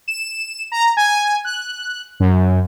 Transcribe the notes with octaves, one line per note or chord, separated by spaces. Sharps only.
E7
A#5
G#5
F#6
F#2